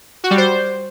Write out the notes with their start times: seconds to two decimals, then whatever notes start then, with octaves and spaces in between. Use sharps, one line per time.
0.24 F#4
0.31 G3
0.38 C5